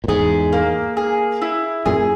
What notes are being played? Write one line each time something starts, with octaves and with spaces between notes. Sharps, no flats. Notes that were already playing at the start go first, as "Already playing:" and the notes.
A#2
E2 G#2 G#4
A#3
G#4
E4
F#2 A#2 G#4